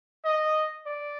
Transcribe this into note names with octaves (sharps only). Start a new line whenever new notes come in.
D#5
D5